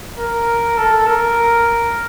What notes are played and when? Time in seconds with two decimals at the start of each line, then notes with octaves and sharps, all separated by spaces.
0.17 A#4
0.78 A4
1.06 A#4